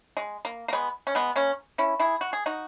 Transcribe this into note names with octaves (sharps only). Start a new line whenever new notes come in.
G#3
A#3
A#3
G#3 B3
C#4
G#3 B3
A#3 C#4
C#4 E4
E4 G#4
F#4
G#4
D#4 F#4